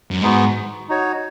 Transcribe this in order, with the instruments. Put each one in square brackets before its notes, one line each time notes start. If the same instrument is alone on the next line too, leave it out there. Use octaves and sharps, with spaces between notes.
[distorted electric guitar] F#2
[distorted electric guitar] G#2 [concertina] G#3 B3 D#4 F#4
[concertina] D#4 F#4 C#5